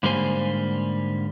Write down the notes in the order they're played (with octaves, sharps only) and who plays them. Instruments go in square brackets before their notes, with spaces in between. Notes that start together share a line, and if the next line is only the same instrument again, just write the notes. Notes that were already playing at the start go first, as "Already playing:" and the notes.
[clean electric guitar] G#2 D3 G3 A#3 C5 G#5